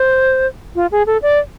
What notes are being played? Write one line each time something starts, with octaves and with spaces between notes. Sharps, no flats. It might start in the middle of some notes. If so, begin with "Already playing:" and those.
Already playing: C5
F4
G#4
A4
D5